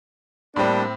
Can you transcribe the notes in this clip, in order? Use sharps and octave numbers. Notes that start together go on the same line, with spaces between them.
A2 G3 A#3 C4 D4